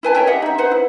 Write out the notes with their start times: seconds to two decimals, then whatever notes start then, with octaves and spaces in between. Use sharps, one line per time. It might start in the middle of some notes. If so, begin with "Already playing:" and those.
0.03 E4 B4 G#5 A5
0.15 A#4 C#5 E5 G5
0.27 G4 D#5 E5 F#5
0.42 D#4 E5
0.58 D#4 B4 C5 F#5
0.71 E4